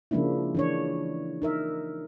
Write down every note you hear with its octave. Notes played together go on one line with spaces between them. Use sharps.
C#3 F3 G#3 A#3 D4 E4
E3 D4 C#5
D#4 A#4 E5